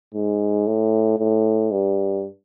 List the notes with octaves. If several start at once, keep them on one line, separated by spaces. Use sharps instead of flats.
G#2
A2
A2
G2